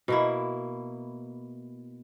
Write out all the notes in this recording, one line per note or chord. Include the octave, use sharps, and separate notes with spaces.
B2 A#3 E4